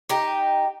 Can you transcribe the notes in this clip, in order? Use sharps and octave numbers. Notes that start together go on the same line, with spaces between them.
D#4 G4